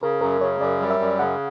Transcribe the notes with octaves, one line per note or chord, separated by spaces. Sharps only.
C#3 A#4
F#2 A#4
C#3 C#5
F#2 D5
G3
E5
F#2
C#3 F#5